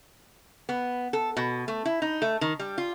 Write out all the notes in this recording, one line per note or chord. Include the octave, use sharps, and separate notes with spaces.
B3
A4
B2
A3
E4
D#4
A3
D#3
G3
F4